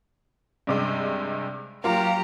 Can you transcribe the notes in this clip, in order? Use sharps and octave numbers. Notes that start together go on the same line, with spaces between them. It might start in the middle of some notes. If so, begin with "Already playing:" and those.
G2 C3 G#3
F#3 A#3 F4 G4 A#5